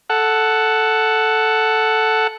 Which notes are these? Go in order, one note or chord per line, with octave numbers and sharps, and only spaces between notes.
A4 F#5